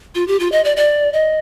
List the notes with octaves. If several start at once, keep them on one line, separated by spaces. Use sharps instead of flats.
F4
G4
F4
D#5
D5
D5
D#5